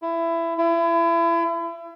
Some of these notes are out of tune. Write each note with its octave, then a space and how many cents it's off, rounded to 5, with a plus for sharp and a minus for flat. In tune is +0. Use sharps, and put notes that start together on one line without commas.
E4 +20
E4 +35